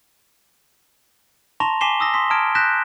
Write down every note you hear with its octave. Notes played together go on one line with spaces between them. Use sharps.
A5 A#5 C6 C#6 A#6 F7
G#5 D6 B6 C7 E7 G7
D#6 E6 A#6
C6 D#6 B6
A5 A#5 D#6 F6 G#6 D7
F#6 G6 A#6 B6 E7